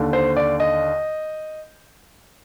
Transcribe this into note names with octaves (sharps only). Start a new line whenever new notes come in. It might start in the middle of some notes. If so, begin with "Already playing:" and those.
Already playing: D#2 D3
C5
D5
D#5